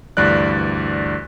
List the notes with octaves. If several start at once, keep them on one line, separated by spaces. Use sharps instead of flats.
D2 G2 E3 D5 F#6